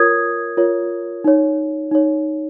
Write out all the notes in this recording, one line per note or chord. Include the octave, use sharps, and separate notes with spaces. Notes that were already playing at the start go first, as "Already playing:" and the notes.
Already playing: F4 A#4 C#5 D#6 G#6
F4 A#4 C#5
D#4 C#5
D#4 C#5